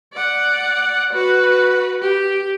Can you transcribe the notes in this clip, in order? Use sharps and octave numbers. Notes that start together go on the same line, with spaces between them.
D5 F#5
F#4 B4
G4